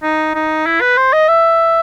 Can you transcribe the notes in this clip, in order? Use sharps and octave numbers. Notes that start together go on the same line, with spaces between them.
D#4
D#4
E4
B4
C5
D#5
E5